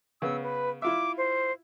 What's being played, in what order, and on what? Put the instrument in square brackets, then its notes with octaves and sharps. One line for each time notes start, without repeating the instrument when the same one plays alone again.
[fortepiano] C#3 B3 [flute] E6
[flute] B4
[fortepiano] E4 F4 E5 [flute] D6
[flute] C5